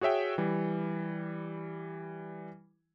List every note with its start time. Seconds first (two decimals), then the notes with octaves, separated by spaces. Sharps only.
0.01 F#4 G#4 C#5 E5 G5
0.38 E3 G3